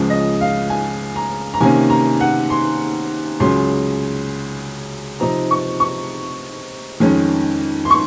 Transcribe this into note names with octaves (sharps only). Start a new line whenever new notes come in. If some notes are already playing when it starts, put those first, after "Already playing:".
Already playing: C#2 C#3 F3 G#3 C#4
D#5
F5
G#5
A#5
A#5
C3 D#3 A#3 C#4 G#5
A#5
F#5
C6
C#2 C#3 F#3 C#4 C6
C3 F3 C4 D#4 A#5
C#6
C#6
F2 D#3 G#3 C#4
C6
C#6